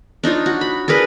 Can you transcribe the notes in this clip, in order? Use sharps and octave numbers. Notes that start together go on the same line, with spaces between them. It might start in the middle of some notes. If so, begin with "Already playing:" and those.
D4 D#4 F4 C#5
F#4
B5
D4 G#4 A#4 B4